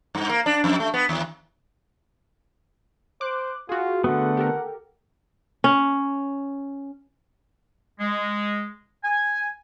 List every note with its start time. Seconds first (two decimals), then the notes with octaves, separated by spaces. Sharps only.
0.15 G2
0.29 A#3
0.46 D4
0.64 F2
0.80 A3
0.94 B3
1.09 D#2
3.21 C5 D6 F#6
3.69 F4 F#4 G#4
4.04 D3 A3 B3 F#5
4.37 G4 A4 A#4
5.64 C#4
8.00 G#3
9.04 G#5